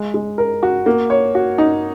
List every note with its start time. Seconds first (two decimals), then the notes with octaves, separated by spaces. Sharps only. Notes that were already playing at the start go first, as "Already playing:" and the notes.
Already playing: G#3
0.14 G#3
0.38 A#4
0.63 F#4
0.86 A#3
1.10 C#5
1.35 F#4
1.58 D#4